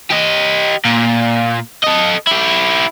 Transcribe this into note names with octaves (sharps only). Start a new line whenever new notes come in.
G4 D#5
A#2
A4 D#5
E4 G4